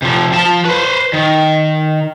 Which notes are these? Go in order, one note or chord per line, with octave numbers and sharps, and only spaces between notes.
C3 F3
F3 A5
B4 C5
D#3